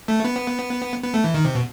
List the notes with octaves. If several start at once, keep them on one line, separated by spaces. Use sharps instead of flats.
A3
B3
B3
A3
E3
D#3
C3
B2